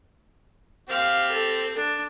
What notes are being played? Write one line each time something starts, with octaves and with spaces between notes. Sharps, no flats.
C4 G4 F5
A4
D4